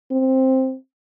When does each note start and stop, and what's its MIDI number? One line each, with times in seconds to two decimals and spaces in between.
0.12 0.75 60